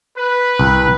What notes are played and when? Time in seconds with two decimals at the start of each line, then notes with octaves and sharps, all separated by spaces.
0.17 B4
0.59 C2